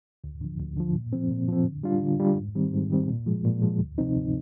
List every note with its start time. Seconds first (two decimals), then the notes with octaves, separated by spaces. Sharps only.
0.24 D2
0.41 D3 F3
0.59 D2
0.76 D3 F3
0.95 A#2
1.13 F3 C4
1.31 A#2
1.48 F3 C4
1.65 D3
1.83 G3 D4 F4
2.02 D3
2.20 G3 D4 F4
2.37 G#2
2.55 D#3 G3 C4
2.73 G#2
2.90 D#3 G3 C4
3.08 A#2
3.26 F3 G#3
3.45 A#2
3.62 F3 G#3
3.79 D2
3.98 C3 F3 C4 D#4
4.15 D2